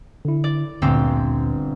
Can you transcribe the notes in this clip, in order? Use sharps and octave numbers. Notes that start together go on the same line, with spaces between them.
D3 E4
D5
G1 D2 A#2 C4 G4